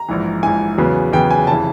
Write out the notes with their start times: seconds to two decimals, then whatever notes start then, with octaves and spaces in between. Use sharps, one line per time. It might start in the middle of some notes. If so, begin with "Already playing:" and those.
Already playing: A#5
0.09 A#1 G#2 E3
0.43 A#1 G#2 E3 G#5
0.78 E2 C#3 F#3 B3
1.13 E2 C#3 F#3 B3 G5
1.31 G#5
1.47 F1 C#3 E3 A5